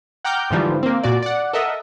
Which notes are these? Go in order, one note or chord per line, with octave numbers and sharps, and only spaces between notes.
F#5 G5 A#5 D6 F6 G6
G#2 D3 E3 F3 G3
A#3 C4
A#2 F#4 D5
D5 F#5
A4 A#4 D#5 E5 F#5